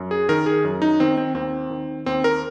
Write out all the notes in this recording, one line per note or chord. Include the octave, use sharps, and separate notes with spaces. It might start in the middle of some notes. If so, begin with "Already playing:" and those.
Already playing: F#2
G#4
D#3 A#4
G#4
F#2
D#4
D#3 C4
C4
D#2 C4
D#3
D#2 C4
A#4